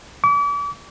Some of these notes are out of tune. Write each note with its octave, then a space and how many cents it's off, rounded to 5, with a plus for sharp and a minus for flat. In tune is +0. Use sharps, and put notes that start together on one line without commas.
D6 -40